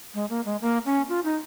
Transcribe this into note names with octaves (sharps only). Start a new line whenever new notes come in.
G#3
A#3
G#3
A#3
C#4
F4
D#4